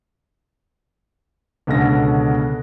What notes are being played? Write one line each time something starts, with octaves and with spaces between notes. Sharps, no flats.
C#2 B2 D3 C#4 A#6